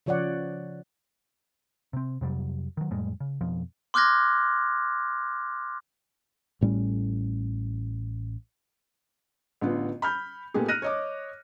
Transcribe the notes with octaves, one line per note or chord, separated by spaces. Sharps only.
C#3 F3 C#5 D5 F#5
C3 C4
F2 C3 F#3 G3
D#3 F#3
F2 A2 G3 G#3
C#3
F2 B2 F3
C6 D6 F6 F#6 G#6 A#6
A1 A2 G3 C#4
A1 D3 B3 F4
B5 F6 G6
A#2 A3 B3 G4 G#4
F6 F#6 A#6 D#7
C#5 D#5 D6